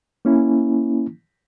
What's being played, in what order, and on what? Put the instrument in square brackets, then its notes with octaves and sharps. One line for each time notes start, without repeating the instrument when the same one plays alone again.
[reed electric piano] A#3 C#4 E4